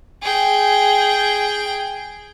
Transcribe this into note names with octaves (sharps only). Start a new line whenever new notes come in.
G#4 G5